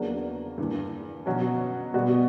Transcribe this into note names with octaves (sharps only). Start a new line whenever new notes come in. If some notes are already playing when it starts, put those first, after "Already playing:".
Already playing: E2 C#3 F#3 A#3 D4
G2 E3 A#3
B2 F#3 C#4 F#4
B2 G3 B3 F#4